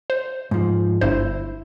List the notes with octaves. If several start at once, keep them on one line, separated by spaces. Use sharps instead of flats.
C5
G#2 F3
G1 G2 E4 C5